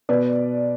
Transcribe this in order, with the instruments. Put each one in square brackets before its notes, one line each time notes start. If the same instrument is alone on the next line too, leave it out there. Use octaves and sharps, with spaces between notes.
[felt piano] B2 B4 D5